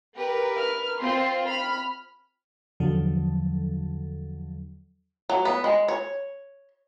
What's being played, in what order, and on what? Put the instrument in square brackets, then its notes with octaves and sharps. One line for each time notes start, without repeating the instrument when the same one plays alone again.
[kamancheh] G4 [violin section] A#4 B4
[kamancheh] F6
[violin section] C4 F4 C5 [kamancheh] C6
[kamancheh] B5 [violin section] F6
[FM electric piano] E2 D3 F3 F#3 A4
[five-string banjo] F#3
B3
G#3
C#5